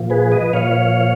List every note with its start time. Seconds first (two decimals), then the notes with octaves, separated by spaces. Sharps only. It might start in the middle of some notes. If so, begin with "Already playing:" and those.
Already playing: A#2 F3
0.10 G#4 B4
0.32 B4 D#5
0.53 A#2 F3 C#5 F5